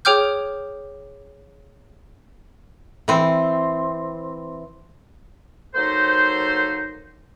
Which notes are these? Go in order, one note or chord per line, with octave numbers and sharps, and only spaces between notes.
G#4 C#5 G5 D6 F6 G6
E3 C4
F#3 A#3 D#4 A4 C5